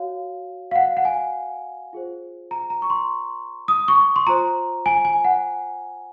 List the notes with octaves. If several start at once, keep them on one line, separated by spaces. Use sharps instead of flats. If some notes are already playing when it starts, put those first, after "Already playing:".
Already playing: F#4 C#5 F5
F5
F#5
F#5
G#5
F4 G#4 C5
A#5
A#5
C#6
C6
D#6
C#6
C6
F4 C5 A#5
G#5
G#5
F#5